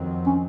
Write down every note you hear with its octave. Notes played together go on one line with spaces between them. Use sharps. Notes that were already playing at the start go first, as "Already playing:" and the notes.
Already playing: F2 D#3 F#3 C4
C#4